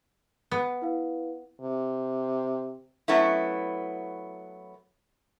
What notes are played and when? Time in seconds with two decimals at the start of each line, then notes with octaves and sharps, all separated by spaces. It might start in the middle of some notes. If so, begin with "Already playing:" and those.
0.52 B3
0.82 E4 B4 F5
1.61 C3
3.08 F#3 A3 B3 C#4 E4